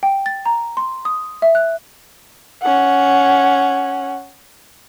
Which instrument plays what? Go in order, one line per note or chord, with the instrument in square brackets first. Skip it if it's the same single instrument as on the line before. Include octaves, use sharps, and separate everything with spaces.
[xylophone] G5
A6
A#5
C6
D#6
E5
F#6
[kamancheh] C#4 F#5